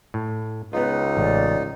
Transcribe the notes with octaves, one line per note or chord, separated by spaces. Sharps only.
A2
C#2 B3 D#4 F4 B4
A1 D5